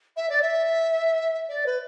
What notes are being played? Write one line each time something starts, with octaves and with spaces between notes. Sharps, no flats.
E5
D5
E5
D5
B4